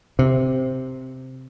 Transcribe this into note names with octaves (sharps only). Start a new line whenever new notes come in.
C3